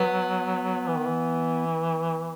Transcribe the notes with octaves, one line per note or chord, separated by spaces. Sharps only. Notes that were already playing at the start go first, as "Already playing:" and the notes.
Already playing: F#3 B3
E3
D#3
E3